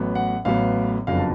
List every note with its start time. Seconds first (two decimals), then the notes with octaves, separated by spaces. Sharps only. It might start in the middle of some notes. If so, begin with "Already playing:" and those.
Already playing: A1 A2 F#3 B3
0.15 F#5
0.45 A1 A2 F#3 B3 F5
1.07 F#1 F2 D3 F#3 B3 F5
1.18 A5